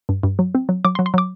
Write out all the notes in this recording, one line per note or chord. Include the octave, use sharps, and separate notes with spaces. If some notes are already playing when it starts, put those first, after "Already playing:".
G2
G2
F#3
C4
F#3
F#3 D6
C6
F#3
C6
F#3 D6